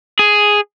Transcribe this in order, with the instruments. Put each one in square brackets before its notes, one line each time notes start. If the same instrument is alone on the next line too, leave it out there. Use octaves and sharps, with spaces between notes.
[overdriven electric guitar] G#4